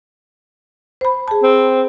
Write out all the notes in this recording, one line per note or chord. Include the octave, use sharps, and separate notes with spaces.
C5 B5
G#4 A5
C4